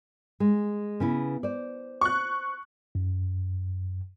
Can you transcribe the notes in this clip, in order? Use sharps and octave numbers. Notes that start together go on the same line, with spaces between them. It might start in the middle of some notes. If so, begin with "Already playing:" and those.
G#3
C#3 B3 E4
C5 D5
C#6 F#6
F#2